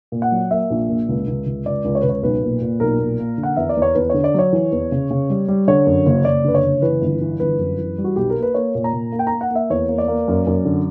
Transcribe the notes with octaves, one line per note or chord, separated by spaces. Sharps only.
A#2
F#5
F#3
A#3 E5
A#1
A#2
C#2
C#2
C#2
C#2 D5
C#2
C#5
B4
C#2
C#5
B1 B4
A#2
A#2
B1 A#4
A#2
A#3
D3
F#5
E2 E5
D5
E2
C#5
E2 B4
D3 C#5
D5
F#3 C#5
E3
E2
C#3
C#3
G3
G3
D3 C#5
F#2
F#1
F#1 D5
D3 B4
C#5
F#1
E3 B4
G1
E3
G1 B4
F#2
E3
G3
F#4
B1 G4
A#4
A#3
B4
A#3 C#5
A#2
A#5
A#2
A#3
G5
A#5
A#3
F#5
A#3 E5
E2 C#5
A#3
D5
A#3
F#2
F#2
D3